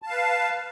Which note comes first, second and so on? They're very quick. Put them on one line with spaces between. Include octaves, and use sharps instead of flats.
A5 F5 B4